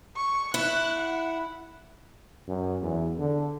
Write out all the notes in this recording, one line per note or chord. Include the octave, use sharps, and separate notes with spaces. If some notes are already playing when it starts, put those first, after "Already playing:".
C#6
E4 F#6
F#5
F#2
E2
D3